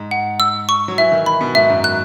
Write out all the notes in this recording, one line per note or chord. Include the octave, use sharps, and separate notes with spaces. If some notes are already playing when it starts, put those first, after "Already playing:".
Already playing: G#2
F#5
E6
C#6
F#3
E3 E5
D#3
B5
B2
G#2 E5
F#2
F#6